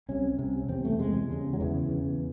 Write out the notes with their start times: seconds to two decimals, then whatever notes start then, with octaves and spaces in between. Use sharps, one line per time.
0.09 C2 C3 C#4
0.38 C2 C3
0.69 E2 C3 C4
0.85 A3
0.99 E2 C3 G#3
1.29 E2 C#3
1.53 F#3
1.60 E2 C#3 E3
1.90 E2 C#3